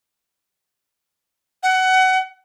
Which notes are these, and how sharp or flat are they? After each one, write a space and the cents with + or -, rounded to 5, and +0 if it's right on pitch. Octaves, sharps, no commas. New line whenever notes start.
F#5 +20